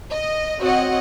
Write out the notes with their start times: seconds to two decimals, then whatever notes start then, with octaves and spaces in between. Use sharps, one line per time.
0.11 D#5
0.59 C4 F#4 C#5 D#5 F#5